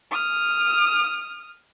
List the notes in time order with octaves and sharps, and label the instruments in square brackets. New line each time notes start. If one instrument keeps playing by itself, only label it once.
[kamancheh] D#6 F6